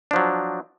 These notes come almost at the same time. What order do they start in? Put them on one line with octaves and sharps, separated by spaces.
D4 F3 F#3